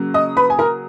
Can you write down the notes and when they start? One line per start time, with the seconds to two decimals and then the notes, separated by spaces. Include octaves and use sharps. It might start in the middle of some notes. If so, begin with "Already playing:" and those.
Already playing: C#3 F#3 A#3
0.14 D#5 D#6
0.37 B4 B5
0.50 G#5
0.59 A#4 A#5